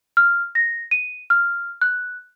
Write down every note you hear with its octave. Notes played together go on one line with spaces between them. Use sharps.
F6
A#6
D#7
F6
F#6